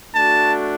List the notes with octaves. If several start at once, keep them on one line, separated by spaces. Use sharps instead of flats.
A3 D4 F#4 A5